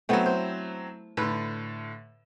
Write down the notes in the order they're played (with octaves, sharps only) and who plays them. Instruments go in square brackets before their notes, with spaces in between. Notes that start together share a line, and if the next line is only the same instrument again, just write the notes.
[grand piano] F#3 C4 [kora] A3 B3 E4
[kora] C5
[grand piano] A2 D3 [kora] B4